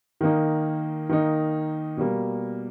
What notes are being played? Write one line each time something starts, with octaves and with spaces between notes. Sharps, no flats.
D#3 A#3 D#4
D#3 A#3 D#4
B2 G3 A#3